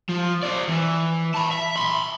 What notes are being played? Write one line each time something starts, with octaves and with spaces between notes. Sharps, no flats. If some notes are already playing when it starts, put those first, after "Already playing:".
F3
C4 D5
E3
A5 B5
E5
B5 C6